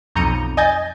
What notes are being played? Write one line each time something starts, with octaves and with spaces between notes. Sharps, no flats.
B1 F2 A#5 G6 C#7 D#7
D#5 G#5 G6 A6